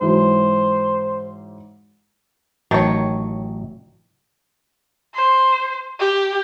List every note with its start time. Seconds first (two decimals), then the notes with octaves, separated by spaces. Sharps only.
0.01 G#2 E3 F#3 C5
2.71 A1 D#3 F#3 C#5 A5
5.14 C5
6.00 G4